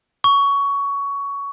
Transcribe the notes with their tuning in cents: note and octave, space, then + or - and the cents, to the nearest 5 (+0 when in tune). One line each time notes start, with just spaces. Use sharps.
C#6 +15